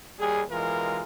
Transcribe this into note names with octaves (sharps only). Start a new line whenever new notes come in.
D#2 G3 G#4
B1 E3 G#3 F4 A#4